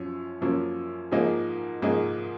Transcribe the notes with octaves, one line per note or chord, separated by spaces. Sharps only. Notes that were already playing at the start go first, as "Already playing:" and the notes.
Already playing: F#2 F3 C#4
F#2 F3 A#3 C#4
G#2 F3 A#3 D#4 G#4
G#2 F3 A#3 D#4 G#4